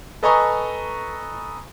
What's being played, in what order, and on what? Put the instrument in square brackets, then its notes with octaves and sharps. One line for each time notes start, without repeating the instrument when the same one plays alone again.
[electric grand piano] A4 B4 D#5 G#5 A#5 C#6